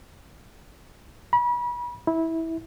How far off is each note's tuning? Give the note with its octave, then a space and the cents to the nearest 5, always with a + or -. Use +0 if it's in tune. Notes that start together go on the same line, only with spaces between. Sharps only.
B5 -35
E4 -15